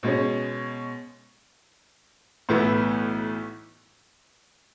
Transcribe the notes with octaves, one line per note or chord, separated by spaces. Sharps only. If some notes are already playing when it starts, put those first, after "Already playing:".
B2 G#3 C#4
B1 A2 E3 B3 E4